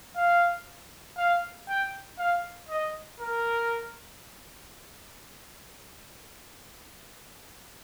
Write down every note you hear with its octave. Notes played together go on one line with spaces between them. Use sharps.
F5
F5
G5
F5
D#5
A#4